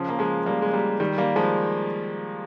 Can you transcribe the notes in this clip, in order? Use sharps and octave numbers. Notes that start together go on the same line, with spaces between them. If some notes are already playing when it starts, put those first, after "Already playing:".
Already playing: C#3 F3
A#3
F3 G#3
G3 A#3
G#3
G3 A#3
D#3 G3
G3 A#3
F3 G#3